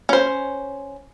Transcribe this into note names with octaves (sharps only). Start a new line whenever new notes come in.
C#4 C5